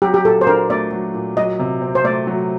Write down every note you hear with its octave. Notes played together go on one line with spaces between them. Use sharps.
F#3 G4
G4
A#2 A4
C5
D4 A#4
A3 D5
F#3
A#2
F#3 D#5
C3
C4
C5
A3 D5
F#3